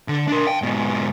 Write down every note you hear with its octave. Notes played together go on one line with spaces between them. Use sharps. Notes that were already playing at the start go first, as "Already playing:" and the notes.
D3
D4 A#4
F5 G5
G#2 B2